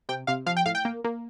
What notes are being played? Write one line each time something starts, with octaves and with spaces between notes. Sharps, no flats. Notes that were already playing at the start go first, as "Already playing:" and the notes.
C3 G5
C3 F5
F3 F5
G5
A2 F5
G5
A#3
A#3